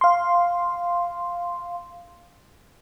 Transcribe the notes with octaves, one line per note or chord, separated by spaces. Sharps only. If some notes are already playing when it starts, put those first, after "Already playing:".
F5 C6